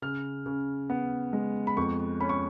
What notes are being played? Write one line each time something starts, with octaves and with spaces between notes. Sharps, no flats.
C#3 F6
C#3
B3
G#3
B5
F2 C#6
C#4 B5
C#6